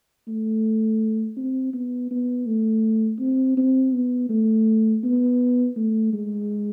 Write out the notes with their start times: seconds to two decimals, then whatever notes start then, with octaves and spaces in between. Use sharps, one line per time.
0.28 A3
1.37 C4
1.73 B3
2.11 B3
2.46 A3
3.20 C4
3.57 C4
3.93 B3
4.29 A3
5.04 B3
5.76 A3
6.13 G#3